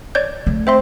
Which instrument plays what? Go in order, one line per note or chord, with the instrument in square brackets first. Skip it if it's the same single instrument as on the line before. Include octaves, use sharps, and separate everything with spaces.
[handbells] C#5 D5 G6
[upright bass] A3
[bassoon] C4 [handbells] C5 E5 C6